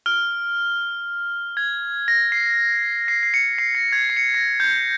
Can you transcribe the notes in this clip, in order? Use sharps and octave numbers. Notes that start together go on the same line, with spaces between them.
F6
G#6
A#6
C7
C7
C7
C#7
C7
A#6
G#6
C7
C#7
C7
A#6
G6